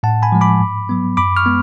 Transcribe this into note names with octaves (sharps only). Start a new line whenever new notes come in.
A2 F#5 A5
G#5 B5
F3 G#3
B5 D6
G#2
F#3 B3
F#2 B5 D6
C#6 F6
G#3 B3